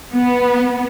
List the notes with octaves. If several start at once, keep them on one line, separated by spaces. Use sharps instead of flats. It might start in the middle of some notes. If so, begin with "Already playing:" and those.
B3